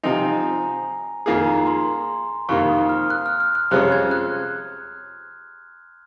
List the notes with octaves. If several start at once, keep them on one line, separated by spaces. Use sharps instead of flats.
C3 F3 C4 D#4 G#5
A#5
A#5
F2 D#3 A#3 F4 G#4 G#5
A#5
C6
F2 C3 D#3 A#3 C#6
D#6
F6
F#6
F6
F6
F#6
F2 C3 F3 G#3 C#4 F#6
G#6
F#6